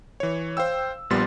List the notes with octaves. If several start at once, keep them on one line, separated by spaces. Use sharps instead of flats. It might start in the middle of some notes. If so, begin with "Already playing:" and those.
E3 C#5
C5 F5 G5 E6
A#1 A#2 G3 B3 C6 A6